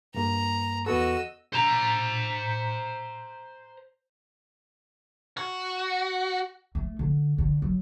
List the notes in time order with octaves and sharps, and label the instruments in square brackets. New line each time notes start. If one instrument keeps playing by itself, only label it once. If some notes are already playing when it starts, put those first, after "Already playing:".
[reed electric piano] G2 A#3 [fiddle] A#5
[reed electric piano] E2 B3 A4 [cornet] F#4 [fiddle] D#5 E6
[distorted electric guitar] C5 A#5
[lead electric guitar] F#4
[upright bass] A3
D3
D3
F#3